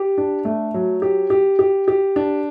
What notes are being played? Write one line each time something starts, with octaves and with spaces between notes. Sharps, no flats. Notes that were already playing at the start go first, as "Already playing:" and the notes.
Already playing: G4
D4
A3
F#3
G4
G4
G4
G4
D4